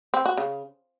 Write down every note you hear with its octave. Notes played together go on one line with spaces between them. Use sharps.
C4
F#4
C#3